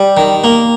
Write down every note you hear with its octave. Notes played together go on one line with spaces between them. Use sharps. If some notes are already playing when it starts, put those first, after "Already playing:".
Already playing: G3
D#3
A#3